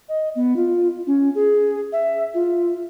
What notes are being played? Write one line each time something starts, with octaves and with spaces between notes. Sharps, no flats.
D#5
B3
F4
C#4
G#4
E5
F4